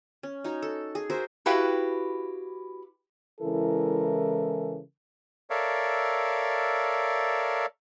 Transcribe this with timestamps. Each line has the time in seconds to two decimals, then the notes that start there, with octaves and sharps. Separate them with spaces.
0.23 C#4
0.44 D#4 F#4 C#5
0.62 A4
0.95 G#4
1.10 F#4 A#4 C5 E5
1.46 E4 F#4 G4 B4 F5
3.41 C#3 E3 G#3 E4 A4 A#4
5.50 A4 A#4 C#5 D5 E5 F5